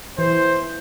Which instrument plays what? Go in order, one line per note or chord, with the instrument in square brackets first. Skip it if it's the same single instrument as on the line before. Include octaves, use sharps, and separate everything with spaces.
[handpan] E3 [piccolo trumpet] C5